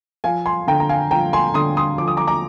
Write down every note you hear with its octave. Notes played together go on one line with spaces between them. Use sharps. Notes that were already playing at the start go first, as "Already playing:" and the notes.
F3 F5 G#5
G#5 C6
D3 G5 A#5
A#5
F5 G#5
F3 G5 A#5
G#5 C6
D3 C6 D#6
C6 D#6
F3 D6
D#6
A#5 D6
A#5 D6